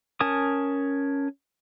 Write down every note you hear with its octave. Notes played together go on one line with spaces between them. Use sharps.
C#4 A#4 G#5 A5 D#6